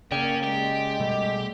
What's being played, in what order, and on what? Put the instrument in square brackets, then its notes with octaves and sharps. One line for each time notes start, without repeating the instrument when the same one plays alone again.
[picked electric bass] C#3 [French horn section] A#3 [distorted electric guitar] C#4 [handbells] D5 G5
[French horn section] G#3 [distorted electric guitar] G4
[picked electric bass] B2 G3 A3